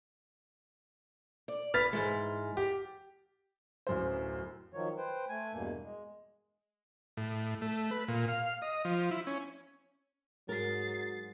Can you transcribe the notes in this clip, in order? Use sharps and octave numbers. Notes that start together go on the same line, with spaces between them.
D5
B4 F6 A6 B6
G#2 E3 G#3
G4
D1 F#2 C5
D#3 F3 F#3 C#5
B4 C5 G5
A3 G#5
E2 G2 B2 A#3
G#3
A2
A3
B4
A#2
F5
D#5
F3
E4
C#4
G#2 F#3 G#3 A#4 A6 C7